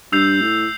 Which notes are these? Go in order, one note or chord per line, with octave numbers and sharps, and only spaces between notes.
G2 E6 G6 C7 F7
A2